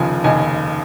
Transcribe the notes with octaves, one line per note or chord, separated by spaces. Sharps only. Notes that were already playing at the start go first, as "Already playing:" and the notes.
Already playing: F1 D#2 C#3 F3 G#5
F1 D#2 C#3 D#5 G#5